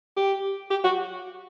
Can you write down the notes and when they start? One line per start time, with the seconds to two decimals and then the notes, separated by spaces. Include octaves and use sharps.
0.17 G4
0.70 G4
0.84 F#4